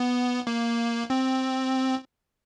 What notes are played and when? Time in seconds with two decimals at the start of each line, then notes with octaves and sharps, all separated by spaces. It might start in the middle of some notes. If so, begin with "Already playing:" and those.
Already playing: B3
0.47 A#3
1.10 C4